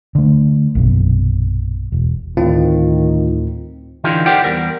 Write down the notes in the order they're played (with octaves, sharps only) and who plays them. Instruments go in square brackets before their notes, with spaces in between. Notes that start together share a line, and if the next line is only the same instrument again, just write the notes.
[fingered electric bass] D3 A3
A#1 F#2 B2
E1
[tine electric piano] D2 A2 C4 [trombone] D#3 [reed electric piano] F4
[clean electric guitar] D3 E3 D#4 F4 G4
G4 A#4 C5 D5 F#5 G5
E2 G3 A#4